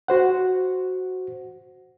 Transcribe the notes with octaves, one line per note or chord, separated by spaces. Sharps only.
F#4 C5 F#5